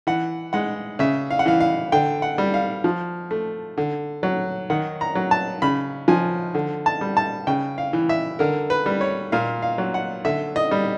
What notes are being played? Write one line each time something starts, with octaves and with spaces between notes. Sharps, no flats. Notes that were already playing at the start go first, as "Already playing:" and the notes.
E3 F#5
G#3 F#5
C#3 E5
F5
F#5
E3 F5
F5
D3 G5
F#5
G3
F5
F3
A3
D3
F#3
D#3 F#5
A#5
F#3
A5
C#3 B5
F3 G#5
D3
A5
G3
A5
C#3 G5
F5
E3
E5
D3 A#4
B4
G3
C#5
A#2 F5
F5
F#3
F#5
D3 E5
D#5
G3